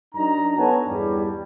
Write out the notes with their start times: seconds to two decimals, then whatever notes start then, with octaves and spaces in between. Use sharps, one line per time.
0.15 F#2 D4 D#4 A#5
0.57 B3 A4 C#5 F#5 G#5 A5
0.88 E2 G2 G3